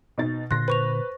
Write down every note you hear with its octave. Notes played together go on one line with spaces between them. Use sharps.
B2 D#4 A6
A#2 D3 C6 F#6 A#6
B4 C5 C#6 F7